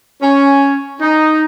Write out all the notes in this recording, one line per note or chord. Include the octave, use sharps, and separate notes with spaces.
C#4
D#4